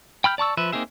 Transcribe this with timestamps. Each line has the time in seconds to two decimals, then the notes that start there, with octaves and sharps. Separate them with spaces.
0.24 G5 B5 F6 G6
0.38 D5 A5 C#6 E6
0.57 F3 B4 E5
0.73 A#3 C4 D#4 G#4 E5